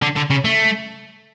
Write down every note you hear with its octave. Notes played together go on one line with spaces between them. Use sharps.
D3
D3
C#3
A3